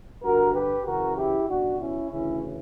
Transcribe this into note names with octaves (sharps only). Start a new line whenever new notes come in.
G2 D3 F#4 A#4
G4 B4
F#2 C#3 E3 F#4 A#4
E4 G4
C#2 B2 D4 F#4
C#4 E4
D2 C#3 E3 C#4 E4